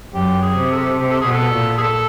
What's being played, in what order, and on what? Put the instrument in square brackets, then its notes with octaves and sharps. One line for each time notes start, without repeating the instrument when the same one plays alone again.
[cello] F#2 [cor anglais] G4
[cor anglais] G#4
[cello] C3
[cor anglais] A4
[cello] C3
[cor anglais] A4
G#4
[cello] B2 [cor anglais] A4
[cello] A#2
[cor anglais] G#4
A4